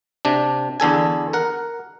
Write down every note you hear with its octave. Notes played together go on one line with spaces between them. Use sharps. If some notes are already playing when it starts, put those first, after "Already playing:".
C3 D4
E2 D3 A4 G#5
A#4 F#5